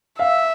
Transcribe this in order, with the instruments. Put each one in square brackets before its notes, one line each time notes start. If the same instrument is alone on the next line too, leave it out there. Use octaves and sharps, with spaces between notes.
[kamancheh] E5 [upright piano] F5